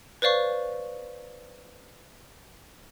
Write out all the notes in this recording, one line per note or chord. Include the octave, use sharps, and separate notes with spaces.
B4 C5 D5 F5 C#6